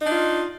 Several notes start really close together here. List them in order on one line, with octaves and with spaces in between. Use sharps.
D#4 D4 F4